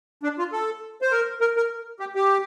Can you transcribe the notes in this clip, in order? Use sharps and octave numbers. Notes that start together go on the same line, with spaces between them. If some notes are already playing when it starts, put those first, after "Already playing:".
D4
F4
A4
C5
A#4
A#4
A#4
G4
G4